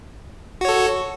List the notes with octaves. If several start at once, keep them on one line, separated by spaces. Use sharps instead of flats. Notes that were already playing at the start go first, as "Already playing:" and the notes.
F#4 A4 C#5